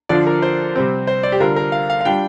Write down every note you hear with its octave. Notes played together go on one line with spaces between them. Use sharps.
D3 F3 D4 F4 D5
A#4
C5
C3 G3 C4
C5
D5
G4
D3 G3 D4 F4 A#4
A#4
F5
F5
F5
G3 D4 F4 G5